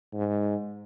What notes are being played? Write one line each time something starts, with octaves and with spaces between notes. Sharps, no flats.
G#2